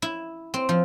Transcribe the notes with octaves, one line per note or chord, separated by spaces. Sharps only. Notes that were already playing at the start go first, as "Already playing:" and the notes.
E4
C4
F3